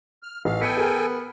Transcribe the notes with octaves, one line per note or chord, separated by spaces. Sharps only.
F6
A1 F5 F6
B3 A4 G5 G#5 B6 C#7
G#4 A#4 F6